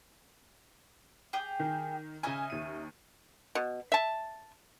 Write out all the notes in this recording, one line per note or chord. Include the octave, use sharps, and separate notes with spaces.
G4 G#4 G5
D#3
C#3 C#4 D#4 E5 G#5
D#2 D#7
B2
E5 A5